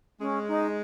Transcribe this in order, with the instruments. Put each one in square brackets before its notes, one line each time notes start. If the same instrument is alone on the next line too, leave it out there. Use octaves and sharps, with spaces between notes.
[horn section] G#3 [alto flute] C#4
[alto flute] D#4